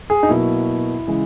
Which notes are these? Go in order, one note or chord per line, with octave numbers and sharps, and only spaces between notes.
G#4
D#4
B2 F#3 A#3 E4
C#3 E3 G#3